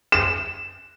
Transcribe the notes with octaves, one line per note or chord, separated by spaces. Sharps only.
E7